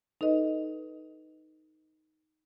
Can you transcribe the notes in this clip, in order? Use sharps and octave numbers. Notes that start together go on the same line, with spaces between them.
D#4 A4 B4 D#5